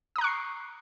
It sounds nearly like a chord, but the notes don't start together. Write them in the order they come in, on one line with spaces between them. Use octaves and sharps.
D#6 A#5 F#6 C#6 C7